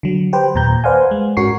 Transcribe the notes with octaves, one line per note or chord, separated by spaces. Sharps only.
D3 F#3
G4 B4 C5 G5
D#2 A#2 A#5 G6
B4 C5 D5 F5 F#5 G#5
G#3
G#2 C#4 F#4 A#4 C#6 C7